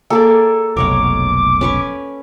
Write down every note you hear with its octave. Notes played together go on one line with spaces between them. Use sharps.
A#3 G#4 A4 D5
F1 B1 A#4 C#5 F#5 D6
C#4 B4 C#6